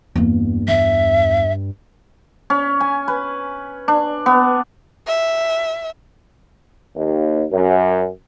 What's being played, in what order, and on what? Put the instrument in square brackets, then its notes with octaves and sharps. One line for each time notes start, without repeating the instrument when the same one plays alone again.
[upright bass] E2 A#3 [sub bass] G2
[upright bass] E2 [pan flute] E5
[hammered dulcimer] C#4
G#5
B4
D4
B3
[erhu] E5
[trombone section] D#2
F#2